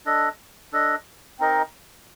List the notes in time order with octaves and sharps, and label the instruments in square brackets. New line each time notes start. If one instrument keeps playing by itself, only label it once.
[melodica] D4 A4 D#5
D4 A4 D#5
C4 D#4 A#4 D#5